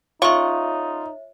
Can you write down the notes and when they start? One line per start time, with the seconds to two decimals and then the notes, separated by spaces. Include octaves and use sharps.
0.22 C#3 D#4 F4 C#5 E5 C#6